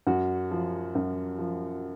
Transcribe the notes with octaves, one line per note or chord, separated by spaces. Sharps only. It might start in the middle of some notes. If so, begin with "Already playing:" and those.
F#2 F#4
F3
F#2
F3